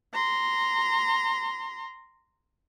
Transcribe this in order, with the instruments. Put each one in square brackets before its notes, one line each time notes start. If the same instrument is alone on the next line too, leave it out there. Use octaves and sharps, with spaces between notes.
[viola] A#5 C6